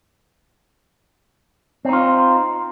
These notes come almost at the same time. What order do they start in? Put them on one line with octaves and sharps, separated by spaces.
C4 D#4 F4